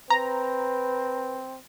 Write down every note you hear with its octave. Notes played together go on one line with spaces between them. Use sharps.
C4 B4 A#5